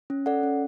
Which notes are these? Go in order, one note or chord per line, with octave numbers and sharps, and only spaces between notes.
C#4
A4 D5 F#5
C#4